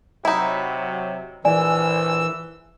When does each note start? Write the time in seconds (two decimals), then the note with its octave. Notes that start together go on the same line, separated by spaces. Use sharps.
0.25 C3 F#3 D#4 E4
1.45 A#1 E3 D5 G#5 E6